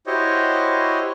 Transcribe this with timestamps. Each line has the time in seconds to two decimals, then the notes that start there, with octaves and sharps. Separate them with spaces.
0.07 E4 F#4 G4 C5 C#5 D#5